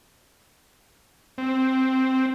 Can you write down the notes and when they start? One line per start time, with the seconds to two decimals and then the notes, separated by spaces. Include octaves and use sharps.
1.38 C4